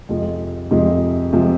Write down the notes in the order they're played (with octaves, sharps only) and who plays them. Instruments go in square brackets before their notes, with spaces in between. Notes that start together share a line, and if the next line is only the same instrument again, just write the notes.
[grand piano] F2 C3 F3 G#3
F2 C3 F3 G#3
C3 F3 G#3